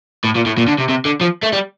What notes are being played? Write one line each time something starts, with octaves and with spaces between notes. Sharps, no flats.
A2
A#2
A2
A#2
D3
C3
C3
D3
F3
A3
G3